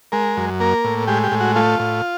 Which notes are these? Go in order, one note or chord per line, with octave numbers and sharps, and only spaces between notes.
G#3 A#4
F#2
A#3 A#4
A2
G#3 G4
G4
A2
F#4
A3 F4
A2